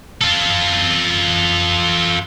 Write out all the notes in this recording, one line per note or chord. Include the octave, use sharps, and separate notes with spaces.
F4 A4